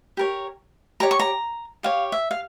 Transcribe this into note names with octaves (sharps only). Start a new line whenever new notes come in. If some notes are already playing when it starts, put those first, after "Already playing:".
G4 A#4 C#5
G4 C#5 A#5
C#6
A#5
G4 C#5 F5
E5
F5